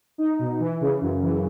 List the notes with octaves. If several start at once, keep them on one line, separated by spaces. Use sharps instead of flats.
D#4
B2
E3
C#3
F#2
E3